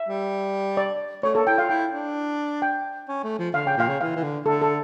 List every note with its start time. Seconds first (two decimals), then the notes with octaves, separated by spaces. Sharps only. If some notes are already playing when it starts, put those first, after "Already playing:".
Already playing: E5
0.08 G3
0.77 D5
1.23 A3 C#5
1.35 A#3 A4
1.47 E4 G5
1.58 F4 F5
1.69 E4 G5
1.93 D4
2.62 G5
3.08 C#4
3.24 A3
3.39 F3
3.54 D3 F5
3.66 C#3 G5
3.77 A#2 F5
3.89 C#3
4.01 E3 F5
4.16 E3
4.23 D3
4.46 D3 A4
4.62 A4